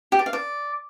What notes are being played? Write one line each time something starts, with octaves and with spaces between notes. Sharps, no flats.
G4
D5
F5
D5